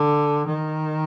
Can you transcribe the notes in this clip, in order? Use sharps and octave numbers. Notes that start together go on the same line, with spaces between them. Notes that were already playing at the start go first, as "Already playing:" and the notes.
Already playing: D3
D#3